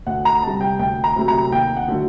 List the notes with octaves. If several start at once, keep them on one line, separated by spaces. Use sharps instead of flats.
D2 F#5
A#5
C3 G3 A5
G5
D2 G5
A#5
C3 F#3 A3
A#5
D#2 G5
F#5
D3 F#3 A3